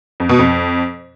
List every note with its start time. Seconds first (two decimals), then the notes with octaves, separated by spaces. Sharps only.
0.20 F2
0.29 B2
0.39 F2